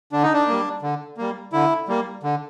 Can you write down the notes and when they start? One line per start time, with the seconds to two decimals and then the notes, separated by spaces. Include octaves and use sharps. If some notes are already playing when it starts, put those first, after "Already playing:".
0.12 D3 D4
0.23 D#4
0.33 D4
0.48 G3 A#3
0.82 D3
1.18 G3 A#3
1.53 D3 E4
1.88 G3 A#3
2.23 D3